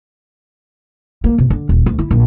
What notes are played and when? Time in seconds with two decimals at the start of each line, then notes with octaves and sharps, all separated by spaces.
1.24 A#3
1.38 C3
1.50 D3
1.69 D#1
1.86 D2
1.99 E4
2.11 A#1